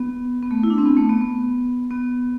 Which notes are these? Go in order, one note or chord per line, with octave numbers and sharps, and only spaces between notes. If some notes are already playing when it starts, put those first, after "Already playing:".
Already playing: B3
B3
A3
E4
D4
C4
B3
A3
B3
B3
B3